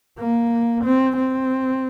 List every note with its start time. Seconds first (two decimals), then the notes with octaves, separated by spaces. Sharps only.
0.18 A#3
0.84 C4
1.16 C4